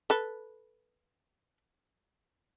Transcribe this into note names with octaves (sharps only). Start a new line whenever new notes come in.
A4 B4